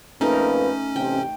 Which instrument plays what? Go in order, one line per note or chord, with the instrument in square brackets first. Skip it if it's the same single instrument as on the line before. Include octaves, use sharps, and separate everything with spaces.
[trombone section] F2 A#3 B4 [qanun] A3 D#4 A#4 [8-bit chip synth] C#4
[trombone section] A1 C3 C4 [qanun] G5